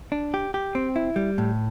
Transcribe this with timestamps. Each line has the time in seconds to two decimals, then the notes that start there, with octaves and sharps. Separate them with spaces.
0.12 D4
0.34 G4
0.54 G4
0.75 C4
0.96 E4
1.16 G3
1.38 A2